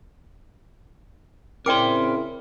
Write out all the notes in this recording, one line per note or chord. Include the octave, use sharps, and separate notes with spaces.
C#3 C4 E4 A#4 D5 G5 C6 D6